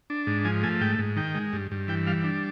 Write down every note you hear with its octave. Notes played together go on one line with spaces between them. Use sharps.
D4
G#2
F3 G#5
A3 G#5
G#2 G5
G#2
D#3 G5
G#3
G2
G2
E3 G5
G3 F5
D4